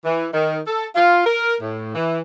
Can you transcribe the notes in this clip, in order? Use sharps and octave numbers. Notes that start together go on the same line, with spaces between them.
E3
D#3
A4
F4
A#4
A2
E3